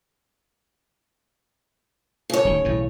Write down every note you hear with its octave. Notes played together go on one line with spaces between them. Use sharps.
C#3 C#5
D1 D#3
B1 A2 E3